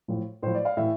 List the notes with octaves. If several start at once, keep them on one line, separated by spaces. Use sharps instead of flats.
A2 F3
A2 F3 C5
D5
F5
A2 E3 E5